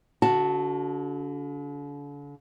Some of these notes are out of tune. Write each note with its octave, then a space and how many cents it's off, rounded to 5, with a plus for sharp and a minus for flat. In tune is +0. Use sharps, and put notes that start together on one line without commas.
D3 -40 F#4 +0 A5 +0